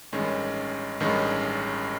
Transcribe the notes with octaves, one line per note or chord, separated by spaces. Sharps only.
A1 G2 D#3 G#3 C#4
A1 G2 D#3 G#3 C#4